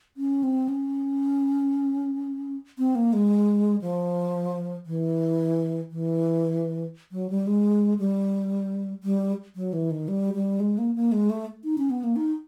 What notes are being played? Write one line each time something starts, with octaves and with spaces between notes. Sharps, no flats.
C#4
C4
C#4
C4
A#3
G#3
F3
E3
E3
F#3
G3
G#3
G3
G3
F#3
E3
D#3
G3
G3
G#3
A#3
A#3
G#3
A3
D#4
C#4
B3
A#3
D#4